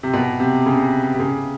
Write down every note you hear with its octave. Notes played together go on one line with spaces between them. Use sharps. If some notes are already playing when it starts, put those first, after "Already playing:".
C3
B2
C3
C#3
C3
C#3